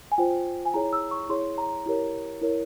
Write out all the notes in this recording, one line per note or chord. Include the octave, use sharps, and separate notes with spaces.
G#5
F4 C5 G5
G#5
E4 G#4 C#5 A#5
E6
C#6
E4 G#4 C#5 C6
A#5
E4 G4 A#4 C#5
E4 A#4 C#5